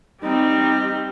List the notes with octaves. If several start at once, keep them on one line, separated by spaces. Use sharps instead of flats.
G3 C4 D#4 G4